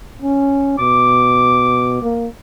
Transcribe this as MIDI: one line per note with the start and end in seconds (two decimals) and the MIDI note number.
0.22 0.76 61
0.79 2.00 47
0.79 2.08 86
2.02 2.27 58